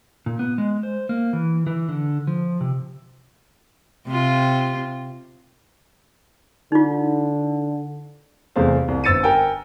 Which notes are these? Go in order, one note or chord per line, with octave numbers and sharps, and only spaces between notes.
A#2
B3
G#3
C5
A#3
E3
E3
D3
F3
C3
C3 C4 F4
D3 D#4 F4
E2 C3 A3 G#4 C5 F5
C2
G1 C5 E6 A6 C#7 D#7
A#4 G5 G#5